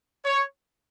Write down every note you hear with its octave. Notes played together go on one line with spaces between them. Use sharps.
C#5